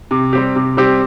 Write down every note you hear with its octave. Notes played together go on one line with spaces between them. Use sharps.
C3
G3 C4 G4
C3
G3 C4 G4